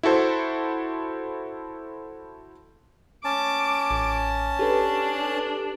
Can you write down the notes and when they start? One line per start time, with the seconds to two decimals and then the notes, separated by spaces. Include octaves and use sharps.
0.03 E4 F#4 A4 C5
3.25 C#4 A5 D6
3.91 A1
4.59 D4 G4 A4 B4